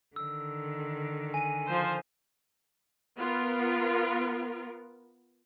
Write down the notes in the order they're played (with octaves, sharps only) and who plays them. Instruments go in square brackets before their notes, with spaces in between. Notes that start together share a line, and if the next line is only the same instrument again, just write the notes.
[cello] D3 D#3 [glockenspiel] E6
[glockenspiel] G#5 D#7
[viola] F3 C5
[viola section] B3 F4 A#4